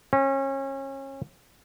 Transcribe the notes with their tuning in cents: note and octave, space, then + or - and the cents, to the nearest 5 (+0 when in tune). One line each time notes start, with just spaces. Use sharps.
C#4 -30